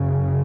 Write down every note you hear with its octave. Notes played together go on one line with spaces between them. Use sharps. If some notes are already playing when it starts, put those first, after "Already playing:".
Already playing: F#2 C#3